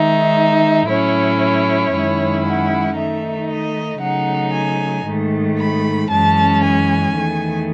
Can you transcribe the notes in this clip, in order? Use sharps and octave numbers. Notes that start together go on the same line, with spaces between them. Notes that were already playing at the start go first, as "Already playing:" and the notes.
Already playing: D#3 G#3 D#4 E5
A2 F#3 C#4 E4 C#5
C#5
F#2 D#3 G#3 C#4 E4
F#5
D#3 A3 D#4 E5
D#5
C#3 F#3 A3 D#4 F#5
G#5
G#2 D#3 A3
B5
F#2 E3 G#3 C#4 A5
G#5
E2 D#3 A3